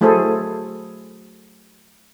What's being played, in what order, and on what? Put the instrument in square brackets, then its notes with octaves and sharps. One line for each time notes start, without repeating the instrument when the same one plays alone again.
[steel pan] F#3 A3 E4 G#4 A4 C5